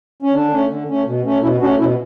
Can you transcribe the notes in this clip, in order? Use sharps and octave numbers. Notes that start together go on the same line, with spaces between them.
C#4
D3 D4
A3 C#4
D3
A3 C#4
B2
A3 C#4
B2 C#4 E4
A3 C#4 D4 F#4
B2 C#4 E4